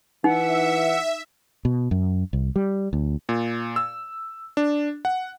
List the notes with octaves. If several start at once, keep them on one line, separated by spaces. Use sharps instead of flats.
E3 D#4 E5 F#5
B2
F#2
C2
G3
D2
A#2
E6
D4
F#5